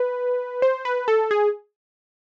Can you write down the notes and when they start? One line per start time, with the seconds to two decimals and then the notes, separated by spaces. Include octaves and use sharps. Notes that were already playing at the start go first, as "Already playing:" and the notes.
Already playing: B4
0.62 C5
0.85 B4
1.08 A4
1.31 G#4